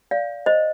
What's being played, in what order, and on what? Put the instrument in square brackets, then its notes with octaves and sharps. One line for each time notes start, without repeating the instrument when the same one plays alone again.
[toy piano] D5 F5
C5 D#5